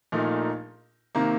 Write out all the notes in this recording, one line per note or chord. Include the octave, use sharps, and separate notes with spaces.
A#1 A#2 A3 D#4 A#4
C3 D#3 A#3